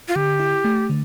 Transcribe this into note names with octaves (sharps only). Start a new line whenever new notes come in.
F4
D3 G4
E4
A3
D3